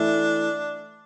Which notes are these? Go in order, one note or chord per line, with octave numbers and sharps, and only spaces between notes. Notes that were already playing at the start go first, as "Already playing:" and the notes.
Already playing: E3 A3 D4 E4